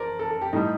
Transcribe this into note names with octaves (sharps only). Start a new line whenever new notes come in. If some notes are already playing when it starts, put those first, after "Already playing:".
Already playing: A#4 C5 D5
A4
A4
G4
A2 G3 D#4